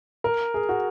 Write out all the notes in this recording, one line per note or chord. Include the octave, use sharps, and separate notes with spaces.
A#4
G#4
F#4